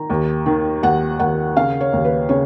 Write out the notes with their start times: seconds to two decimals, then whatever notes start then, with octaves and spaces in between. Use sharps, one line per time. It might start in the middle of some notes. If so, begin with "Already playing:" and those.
Already playing: D#3 A#5
0.10 D#2
0.46 D#3
0.83 D#2 F#5
1.19 D#2 F#5
1.56 C#3 F5
1.81 C#5
1.93 D#2
2.05 B4
2.29 C#3 C#5